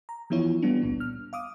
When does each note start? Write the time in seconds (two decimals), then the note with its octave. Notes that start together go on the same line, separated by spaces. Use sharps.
0.09 A#5
0.30 E3 F3 B3 E4 F4 C#5
0.62 G3 B3 D4
0.82 G#1 C#2 A#2 B3
1.00 F6
1.33 F5 D6 D#6